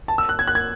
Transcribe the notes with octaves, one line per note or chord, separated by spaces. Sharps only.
A5
E6
F#6
G#6
F#6
G#6